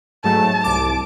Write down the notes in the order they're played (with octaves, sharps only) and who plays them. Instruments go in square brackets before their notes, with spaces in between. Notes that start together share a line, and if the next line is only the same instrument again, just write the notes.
[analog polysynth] G#2 F#3 A3 [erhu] A5
[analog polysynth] C2 D6